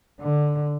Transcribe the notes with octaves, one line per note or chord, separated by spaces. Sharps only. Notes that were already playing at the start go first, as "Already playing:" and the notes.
D3